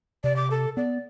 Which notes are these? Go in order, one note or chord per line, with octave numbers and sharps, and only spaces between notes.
C3 D5
D6
A4
B3 D5